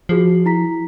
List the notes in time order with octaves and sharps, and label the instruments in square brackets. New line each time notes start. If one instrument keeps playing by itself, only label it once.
[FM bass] F3 [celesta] F#4 G#4 C7
[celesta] E4 A#5 B6